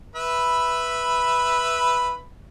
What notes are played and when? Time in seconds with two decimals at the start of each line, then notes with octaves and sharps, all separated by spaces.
0.16 B4 E5 B5